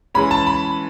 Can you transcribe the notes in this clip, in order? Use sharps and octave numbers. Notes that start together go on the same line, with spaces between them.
E3 G#3 C#4 B5
A5
B5